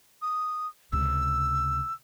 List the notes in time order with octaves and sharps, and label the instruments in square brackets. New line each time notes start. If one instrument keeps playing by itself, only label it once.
[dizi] D#6
[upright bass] C#2 C3 [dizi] E6